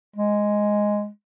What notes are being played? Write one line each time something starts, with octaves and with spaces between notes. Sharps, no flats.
G#3